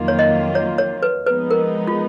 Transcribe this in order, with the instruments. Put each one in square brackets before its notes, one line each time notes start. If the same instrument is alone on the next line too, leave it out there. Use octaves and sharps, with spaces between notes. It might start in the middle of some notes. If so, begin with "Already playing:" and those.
Already playing: [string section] F2 D#3 F#3 A#3 F4
[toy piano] C#5
D#5
C#5
C#5
B4
[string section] F3 G#3 B3 D#4 [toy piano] B4
[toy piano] A#4
F4